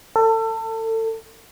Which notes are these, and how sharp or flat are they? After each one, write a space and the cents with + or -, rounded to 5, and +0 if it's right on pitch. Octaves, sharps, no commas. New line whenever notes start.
A4 +30